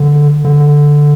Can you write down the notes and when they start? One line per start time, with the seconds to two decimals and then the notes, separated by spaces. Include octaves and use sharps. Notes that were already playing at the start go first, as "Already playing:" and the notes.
Already playing: D3
0.45 D3